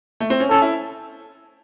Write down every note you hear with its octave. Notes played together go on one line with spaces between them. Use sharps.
A3
C4
C#4
C#4 A4
E4